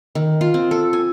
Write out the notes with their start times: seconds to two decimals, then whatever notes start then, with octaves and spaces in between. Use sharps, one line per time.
0.15 D#3
0.41 F4
0.54 C4
0.71 A4
0.93 G#5